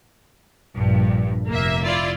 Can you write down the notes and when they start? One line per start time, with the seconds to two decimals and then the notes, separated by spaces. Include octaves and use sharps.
0.77 A#1 G2
1.48 F1 A#3 E5
1.84 E4 F4 D5